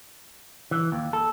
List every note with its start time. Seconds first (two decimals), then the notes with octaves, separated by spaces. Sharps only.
0.71 E3
0.92 D#2
1.13 A4